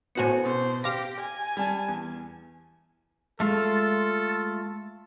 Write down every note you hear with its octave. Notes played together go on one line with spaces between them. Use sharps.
A2 B3 F#4 C5 G#5 C#7
B2 C5
G4 F5 D6 A#6
G#5
G3 A5
E2
G#3 A3 F4 A4 E6